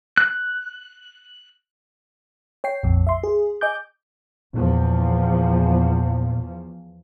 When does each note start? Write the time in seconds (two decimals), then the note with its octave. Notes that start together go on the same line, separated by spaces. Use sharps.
0.17 F#6
2.64 C#5 G5 C7
2.83 A#1 F2
3.07 E5 C6
3.23 G#4
3.61 D#5 G#5 D6 G6
4.54 E2 A#2 F3